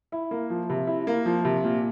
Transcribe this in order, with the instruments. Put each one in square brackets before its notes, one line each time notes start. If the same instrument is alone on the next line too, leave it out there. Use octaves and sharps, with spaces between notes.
[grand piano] E4
A#3
F3
C3
E4
A#3
F3
C3
A#2